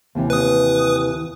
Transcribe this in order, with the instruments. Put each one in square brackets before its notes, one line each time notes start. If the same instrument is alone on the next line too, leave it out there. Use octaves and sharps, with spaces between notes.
[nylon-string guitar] D#2 C3 E3
[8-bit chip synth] B4 D#6